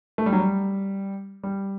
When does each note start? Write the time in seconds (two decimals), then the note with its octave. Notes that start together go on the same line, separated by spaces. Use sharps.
0.18 A3
0.26 G3
0.33 F#3
0.40 G3
1.43 G3